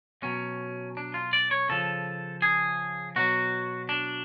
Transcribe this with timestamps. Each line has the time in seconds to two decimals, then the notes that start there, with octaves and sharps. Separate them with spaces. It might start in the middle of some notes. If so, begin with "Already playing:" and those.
0.22 B2 F#3 C#4
0.97 D4
1.14 F4
1.33 D5
1.51 C#5
1.69 C#3 F3 A4
2.42 G#4
3.16 B2 F#3 F#4
3.89 D4